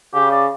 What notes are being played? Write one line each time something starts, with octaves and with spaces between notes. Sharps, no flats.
C#3 G4
D5